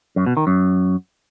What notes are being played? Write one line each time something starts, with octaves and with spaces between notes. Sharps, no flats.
F#2
B2
D#3
F#2